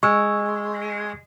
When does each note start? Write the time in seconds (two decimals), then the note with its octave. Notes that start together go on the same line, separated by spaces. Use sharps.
0.03 G#3 C#6 E6